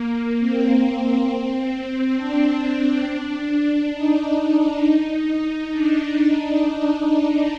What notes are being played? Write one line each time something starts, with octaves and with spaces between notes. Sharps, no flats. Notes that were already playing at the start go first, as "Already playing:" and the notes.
Already playing: A#3
C4
D4
D#4
D4